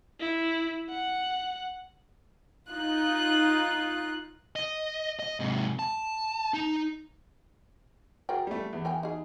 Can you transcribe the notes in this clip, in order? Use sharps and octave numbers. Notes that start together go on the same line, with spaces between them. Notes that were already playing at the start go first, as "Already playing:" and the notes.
E4
F#5
D#4 F4 F#6
D#5
D#5
G#2 C3
A5
D#4
F#4 G#4 A#4 D5 G5
G3 A3
E2
A#4 G5 G#5
D#4 G#4